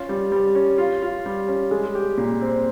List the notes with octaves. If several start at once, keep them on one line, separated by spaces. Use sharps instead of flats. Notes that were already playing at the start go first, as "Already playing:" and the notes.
Already playing: C#4 F4
G3
G3
C#4
F4
F4
G3
C#4
G#3
G4
A#2
C4